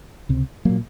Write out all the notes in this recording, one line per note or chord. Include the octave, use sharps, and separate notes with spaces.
C#2 C3
A#2 F#3 A#3